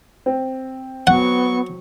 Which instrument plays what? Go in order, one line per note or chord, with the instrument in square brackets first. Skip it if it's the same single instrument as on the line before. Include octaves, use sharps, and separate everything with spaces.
[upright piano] C4
[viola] F#3 C#6 [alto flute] B3 [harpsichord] F#5